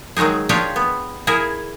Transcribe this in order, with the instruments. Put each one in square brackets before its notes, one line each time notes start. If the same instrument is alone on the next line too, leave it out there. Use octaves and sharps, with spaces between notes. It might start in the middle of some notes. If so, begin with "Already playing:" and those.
[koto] D#3 F#3 G#3 D#4 G#4
D4 F4 G4 G#4 C#5 D5
B3
E4 G#4 A#4